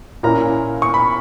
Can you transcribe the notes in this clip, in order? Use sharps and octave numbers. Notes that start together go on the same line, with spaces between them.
A#2 A#3 C#4 E4 A#5
C#6
B5